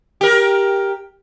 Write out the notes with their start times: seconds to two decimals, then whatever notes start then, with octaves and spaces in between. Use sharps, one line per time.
0.21 G4 A#4